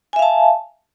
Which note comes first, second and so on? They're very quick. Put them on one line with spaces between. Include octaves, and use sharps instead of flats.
G#5 E5 F5 A5